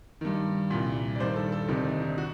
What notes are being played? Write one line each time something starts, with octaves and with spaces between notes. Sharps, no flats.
G2 D#3
C2 A#2
D5
G2 D#3 C5
A4
A4
D2 C3 D#3 D4
D#4
D#4
F#4